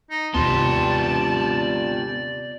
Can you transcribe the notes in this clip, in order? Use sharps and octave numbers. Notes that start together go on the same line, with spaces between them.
D#4
D#2 C3 B3 F4 G4 D5 A5 C6